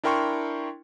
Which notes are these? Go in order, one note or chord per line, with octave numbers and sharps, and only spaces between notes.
D4 E4 A#4 G5 C6 C#6